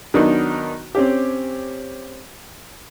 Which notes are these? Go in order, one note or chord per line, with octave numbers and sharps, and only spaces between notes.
D#3 F#3 B3 D4 D#4
C4 C#4 G4